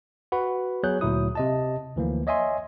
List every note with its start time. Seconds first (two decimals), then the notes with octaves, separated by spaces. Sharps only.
0.32 F#4 B4 F#5 B5
0.83 F#3 B3 G#4 C#5 F#6 G6
1.01 D2 A#2 F#3 E4 D#6
1.35 C3 D#5 A5
1.96 D2 E3 F3 A#3
2.27 C#5 D#5 E5 G#5 C6